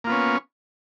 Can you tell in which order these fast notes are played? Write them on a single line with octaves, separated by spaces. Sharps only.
A#3 F4 B3 C#4